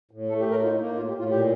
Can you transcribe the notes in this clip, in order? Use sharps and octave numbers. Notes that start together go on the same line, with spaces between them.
A2
A3 A4
G4
A2 A#4
D#4 F4
D#4
A#3
D#4
A2 F4
G4
A2
F4
A#2 G4